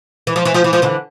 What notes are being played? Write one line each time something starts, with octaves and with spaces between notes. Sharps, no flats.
E3
F3
E3
F3
E3
F3
D3 E3